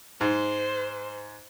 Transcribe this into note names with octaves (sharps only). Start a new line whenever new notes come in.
G#2 C5